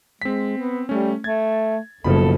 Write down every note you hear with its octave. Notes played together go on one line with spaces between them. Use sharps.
G#3 C4 B6
B3
G3 A3 C#4
A3 G#6 A6
F#1 B2 F3 A4 B5